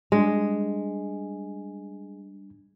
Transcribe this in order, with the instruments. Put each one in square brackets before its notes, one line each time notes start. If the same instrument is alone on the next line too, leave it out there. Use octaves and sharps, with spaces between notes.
[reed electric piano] G3 D4 [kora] G#3